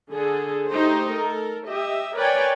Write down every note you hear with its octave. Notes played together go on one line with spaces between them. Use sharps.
D3 G#4 A4
A3 D#4 G4 C5
A4 A#4
G4 D#5 E5
A#4 B4 C#5 D5 G5 G#5